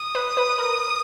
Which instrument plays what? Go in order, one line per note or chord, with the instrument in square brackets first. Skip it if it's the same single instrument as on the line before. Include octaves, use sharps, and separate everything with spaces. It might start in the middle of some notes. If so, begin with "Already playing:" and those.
Already playing: [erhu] D#6
[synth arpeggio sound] B4
B4
A#4